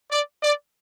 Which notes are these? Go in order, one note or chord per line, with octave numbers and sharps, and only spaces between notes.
D5
D5